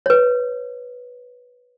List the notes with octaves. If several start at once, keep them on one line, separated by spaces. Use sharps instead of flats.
B4 C#5